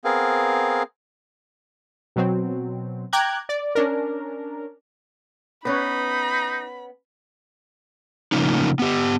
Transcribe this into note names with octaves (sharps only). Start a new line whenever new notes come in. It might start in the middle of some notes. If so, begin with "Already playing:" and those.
B3 C4 G#4 A#4 F5
B2 F#3 C4
G5 A#5 D6 F#6 G#6
D5
C#4 D4 A#4
B3 C#4 D#4 B4 C#5 B5
A2 C#3 F3 A#3 C#4 D#4
B3 G4